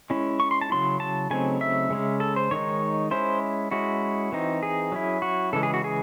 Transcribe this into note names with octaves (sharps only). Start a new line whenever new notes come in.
G#3 C#4 E4
C#6
C6
A5
C#3 F#3 C#4 E4 C6
A5
C#3 F#3 A3 C4 D#4 G#5
E5
C#3 G#3 C#4
A4
C5
D#3 G#3 D#4 C#5
G#3 C#4 E4 C5
G#3 C#4 E4 F#4
E3 C4 D#4
G#4
F#3 C#4 E4
F#4
C#3 E3 G#3 A4
G#4
F#4
G#4